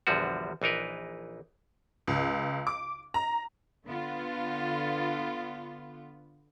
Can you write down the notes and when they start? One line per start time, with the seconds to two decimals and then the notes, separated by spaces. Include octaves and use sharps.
0.07 A#1 E2 D3 F3 G3 F#4
0.62 A#1 E3 D#4 A#4 B4
2.07 C#2
2.67 D6
3.14 A#5
3.86 D3 B3 F4